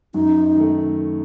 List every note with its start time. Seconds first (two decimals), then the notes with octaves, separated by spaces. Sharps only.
0.14 F#2 D#4
0.55 D#3 A3